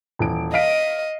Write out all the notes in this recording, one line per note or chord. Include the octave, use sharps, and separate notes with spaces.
D#1 E3 D7
D#5 F5 B6 D7